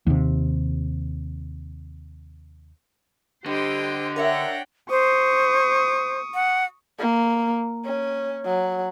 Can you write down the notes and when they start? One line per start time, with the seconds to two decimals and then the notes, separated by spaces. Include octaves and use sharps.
0.07 D#2 C3
3.46 D3 G3 G4 C5 D#5 G5
4.16 D4 A#4 C#5 D#5 E5 F#5 G5 A#6
4.90 C5 C#6 D#6
6.35 F#5
6.99 A#3
7.85 C#4
8.45 F#3